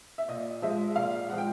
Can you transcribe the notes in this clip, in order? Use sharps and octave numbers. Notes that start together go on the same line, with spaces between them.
E5
A#2 D#5
F3 G#3 E5
A#2 F5
F3 G#3 F#5
G5